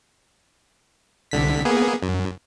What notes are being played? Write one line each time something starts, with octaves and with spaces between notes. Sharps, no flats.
C2 D3 B6
A#3 B3 G#4
F#2